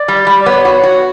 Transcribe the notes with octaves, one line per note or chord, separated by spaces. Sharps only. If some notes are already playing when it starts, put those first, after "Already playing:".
Already playing: D5
G3
G3
D5
B3 C#5
F#4
F#4